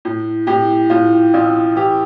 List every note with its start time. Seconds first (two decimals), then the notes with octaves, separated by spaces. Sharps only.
0.05 A2
0.47 A2 G4
0.90 A2 F4
1.34 A1 F4
1.76 E3 G4